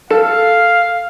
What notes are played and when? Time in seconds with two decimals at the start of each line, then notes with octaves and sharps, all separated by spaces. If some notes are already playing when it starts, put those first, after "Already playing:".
0.11 A4 F5